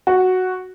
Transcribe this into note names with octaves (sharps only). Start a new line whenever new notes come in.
F#4